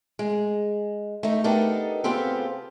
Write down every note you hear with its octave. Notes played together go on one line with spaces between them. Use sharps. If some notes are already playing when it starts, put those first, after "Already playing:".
G#3
A3 D#4
B3 D4 D#4 G4 A4 A#4
C#3 B3 C4 F4 G4 A4